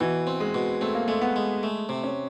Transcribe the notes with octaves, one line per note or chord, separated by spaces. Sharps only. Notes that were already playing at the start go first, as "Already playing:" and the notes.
B2 E3
C4
G#3
B2
A3 C4
A#3
G#3 A3
B3
G#3
A3
C3
C#4